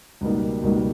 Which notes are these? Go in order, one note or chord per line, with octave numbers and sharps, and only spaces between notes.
C#2 B2 G3 A#3 D#4
C#2 B2 G3 A#3 D#4